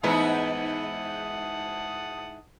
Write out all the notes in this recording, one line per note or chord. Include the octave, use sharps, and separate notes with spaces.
G#2 E3 B3 D#4 E4 F#5 A5 D#6